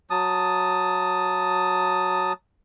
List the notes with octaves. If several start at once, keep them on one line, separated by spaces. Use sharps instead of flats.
F#3 A5 D#6